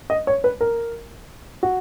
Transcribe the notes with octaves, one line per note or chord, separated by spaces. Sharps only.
D#5
C#5
B4
A#4
F#4